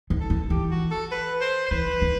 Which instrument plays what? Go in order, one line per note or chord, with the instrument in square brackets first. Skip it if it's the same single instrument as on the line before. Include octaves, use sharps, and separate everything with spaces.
[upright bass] D#3
[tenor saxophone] A4
[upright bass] E3
[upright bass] E3 [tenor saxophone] G4
[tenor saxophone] F#4
A4
B4
C5
C5
[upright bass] E3 [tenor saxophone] B4
[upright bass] D#3